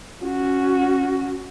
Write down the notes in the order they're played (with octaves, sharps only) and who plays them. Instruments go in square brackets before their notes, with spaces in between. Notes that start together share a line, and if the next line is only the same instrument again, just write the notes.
[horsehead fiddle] C#4 F#4